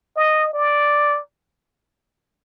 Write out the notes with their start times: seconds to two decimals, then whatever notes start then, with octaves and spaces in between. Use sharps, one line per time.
0.16 D#5
0.53 D5